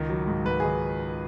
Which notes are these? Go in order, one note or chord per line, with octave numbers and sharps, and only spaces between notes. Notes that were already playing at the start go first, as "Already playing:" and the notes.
Already playing: C#2 D#3
F#3
G#2
G#2 B4
D#3 G#4